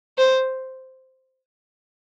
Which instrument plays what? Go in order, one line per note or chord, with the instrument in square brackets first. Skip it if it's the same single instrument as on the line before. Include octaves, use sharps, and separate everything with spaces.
[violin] C5